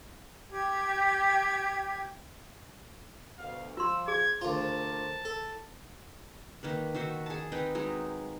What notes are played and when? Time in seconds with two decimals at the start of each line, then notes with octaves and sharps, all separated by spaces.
0.50 G4 G5 G#6
3.39 D2 B2 F5
3.77 F3 F4 C6 E6
4.08 G#4 G#6
4.41 D2 F4 A4 A#4 C5 A5
5.25 A4
6.63 D#3 A#3 B4
6.95 D#3 F#4 C5 E5
7.26 G#4 A5
7.52 C4 D#4 B4 G5
7.75 F#3 G#3 D#4